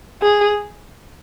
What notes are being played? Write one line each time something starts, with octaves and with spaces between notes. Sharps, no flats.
G#4